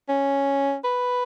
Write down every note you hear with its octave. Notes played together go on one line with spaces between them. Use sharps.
C#4
B4